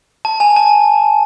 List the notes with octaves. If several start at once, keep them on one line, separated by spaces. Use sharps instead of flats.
A5
G#5
A5